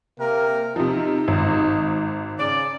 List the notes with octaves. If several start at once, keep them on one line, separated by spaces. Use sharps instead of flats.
C3 A#3 A#4
C3 F3 D#4
G#1
C#3 D5